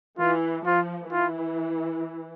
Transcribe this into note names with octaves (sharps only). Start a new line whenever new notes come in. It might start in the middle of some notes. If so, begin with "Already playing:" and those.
E3 F4
F3 F4
E3 F4